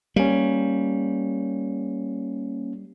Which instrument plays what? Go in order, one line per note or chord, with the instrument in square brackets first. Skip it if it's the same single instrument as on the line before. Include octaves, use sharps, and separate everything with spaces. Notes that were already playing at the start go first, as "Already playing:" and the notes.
[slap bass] G3 [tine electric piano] A#3 C#4